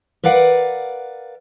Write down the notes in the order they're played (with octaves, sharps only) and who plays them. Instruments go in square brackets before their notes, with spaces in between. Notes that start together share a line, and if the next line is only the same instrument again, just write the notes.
[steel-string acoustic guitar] A#4 B4 D5 F5 F#5